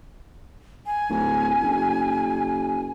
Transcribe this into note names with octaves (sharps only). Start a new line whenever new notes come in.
G#5
D1
F#1